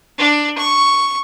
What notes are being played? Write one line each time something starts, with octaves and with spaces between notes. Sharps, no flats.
D4
C#6